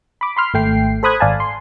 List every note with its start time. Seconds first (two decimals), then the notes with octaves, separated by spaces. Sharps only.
0.21 B5 D6
0.37 B5 C6 F6
0.54 G#1 A3 G5 C7
1.03 A4 C5 B5 D#6 F#6 G#6
1.20 G#1 D5 F5 G#5 A5
1.40 C6